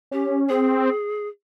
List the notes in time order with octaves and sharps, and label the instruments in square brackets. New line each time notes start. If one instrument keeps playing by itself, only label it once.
[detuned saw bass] C#4 [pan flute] G4
[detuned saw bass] C4 [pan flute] G#4